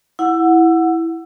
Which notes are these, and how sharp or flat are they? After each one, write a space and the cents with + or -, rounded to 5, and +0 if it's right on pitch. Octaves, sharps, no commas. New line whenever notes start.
E4 -5 F#5 -10 E6 +20